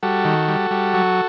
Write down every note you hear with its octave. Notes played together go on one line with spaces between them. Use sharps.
G3 F#4 A4
D#3
G3
G3
F#3